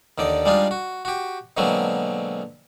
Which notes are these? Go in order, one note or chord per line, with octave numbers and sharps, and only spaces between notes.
D#2 D3 D#4 D5
G3 G#3 D4 D#4 F4
F#4
F#4 G4
B2 D3 F#3 G#3 A#3 C4